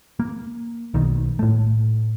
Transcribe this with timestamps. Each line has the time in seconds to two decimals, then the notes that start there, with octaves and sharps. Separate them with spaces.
0.20 A#3
0.94 B1 D#3
1.39 A2 A3